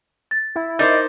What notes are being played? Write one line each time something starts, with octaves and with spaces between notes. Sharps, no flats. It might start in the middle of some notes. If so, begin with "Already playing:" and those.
A6
E4
D#4 A#4 C5 D5 G6